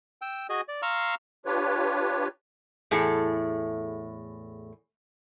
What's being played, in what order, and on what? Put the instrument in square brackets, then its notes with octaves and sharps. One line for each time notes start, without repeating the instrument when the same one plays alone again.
[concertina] G5 E6
F#4 G#4 D#5 G#5
D5
F5 A#5 C6 C#6 E6 F6
[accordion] D4 F4 G4 B4 C#5
[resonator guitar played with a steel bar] E2 A2 G#4 A4